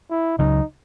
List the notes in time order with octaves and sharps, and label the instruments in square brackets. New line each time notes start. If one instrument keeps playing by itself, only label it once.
[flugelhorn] E4
[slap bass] C#2 C#3 F#3 [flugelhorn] D#4